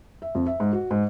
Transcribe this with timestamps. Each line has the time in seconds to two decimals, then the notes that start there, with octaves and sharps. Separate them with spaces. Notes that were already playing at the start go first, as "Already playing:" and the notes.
0.22 E5
0.35 F2
0.47 E5
0.60 G#2
0.73 F#4
0.91 G#2